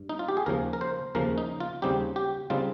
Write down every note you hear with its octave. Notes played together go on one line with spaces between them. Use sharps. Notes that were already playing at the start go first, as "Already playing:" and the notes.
Already playing: G2
D#4
F4
G4
G#4
D#2 C#3 F3 A#3 A#4
A#4
C5
D#2 C#3 F3 A#3 A#4
D#4
F4
D#2 C#3 G3 C4 D#4 G4
G4
C#3 G3 C4 D#4 F4